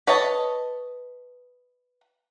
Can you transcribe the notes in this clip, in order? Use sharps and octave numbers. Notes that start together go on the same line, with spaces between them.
B4 C#5 D#5 A5